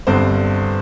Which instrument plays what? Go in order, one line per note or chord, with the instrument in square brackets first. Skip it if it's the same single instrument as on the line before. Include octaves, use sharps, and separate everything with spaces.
[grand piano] G1 G2 D3 G3 C4 C5